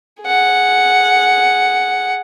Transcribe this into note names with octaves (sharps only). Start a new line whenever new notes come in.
G#4 F#5